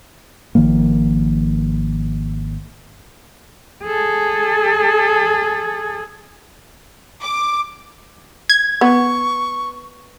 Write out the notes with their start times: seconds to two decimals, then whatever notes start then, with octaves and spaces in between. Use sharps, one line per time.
0.55 G#1 D#3 F3 A#3
3.84 G#4 A4
7.21 D6
8.50 G#6
8.81 B3 C#6